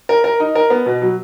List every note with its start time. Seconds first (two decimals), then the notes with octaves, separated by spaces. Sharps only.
0.09 A#4
0.24 A#4
0.40 D#4
0.55 A#4
0.70 B3
0.86 B2
1.02 F#3